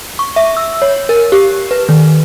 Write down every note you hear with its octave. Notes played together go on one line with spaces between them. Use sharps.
C#6
E5
E6
C#5
A#4
G4
B4
D#3